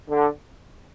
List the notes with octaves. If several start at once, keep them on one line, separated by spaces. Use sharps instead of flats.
D3